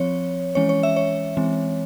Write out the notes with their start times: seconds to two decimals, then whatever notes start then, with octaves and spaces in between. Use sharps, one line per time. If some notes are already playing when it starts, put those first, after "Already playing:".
Already playing: F3 C4 C#5
0.55 E3 G#3 C#4 C#5
0.69 C#5
0.83 E5
0.96 C#5
1.37 E3 G#3 C4